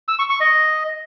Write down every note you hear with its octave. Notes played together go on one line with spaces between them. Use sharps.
E6
C#6
C#6
D#5